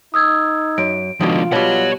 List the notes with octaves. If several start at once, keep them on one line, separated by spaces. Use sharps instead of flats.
D#4 D#6 E6 G#6
F#2 D7
B2 D3 D#3 F3 G#3 F4
B2 G3 C#5 F#5